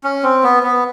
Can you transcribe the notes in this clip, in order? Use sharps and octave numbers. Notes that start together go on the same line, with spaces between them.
C#4
C4
B3
B3